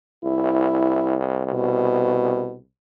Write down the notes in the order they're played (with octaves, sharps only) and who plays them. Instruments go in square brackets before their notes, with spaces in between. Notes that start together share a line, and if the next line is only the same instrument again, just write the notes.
[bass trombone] C2 [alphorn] E4
[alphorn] B2